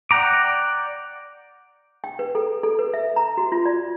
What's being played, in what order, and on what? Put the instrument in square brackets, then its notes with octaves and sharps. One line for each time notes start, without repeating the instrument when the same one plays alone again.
[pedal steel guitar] D5 F#5 G5 A#5 D6
[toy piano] G5
B4
A4
A4
B4
E5
A#5
F#4
F4
D5